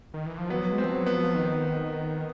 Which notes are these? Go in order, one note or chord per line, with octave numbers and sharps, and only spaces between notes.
D#3
E3
F3
F#3 B3
G#3
C4
F3
F#3
B3
F3
D#3